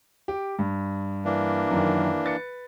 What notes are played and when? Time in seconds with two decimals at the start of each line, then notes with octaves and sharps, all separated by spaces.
0.28 G4
0.59 G2
1.25 E3 A#3 D4
1.71 F#2 D#3
2.25 B4 A6 C#7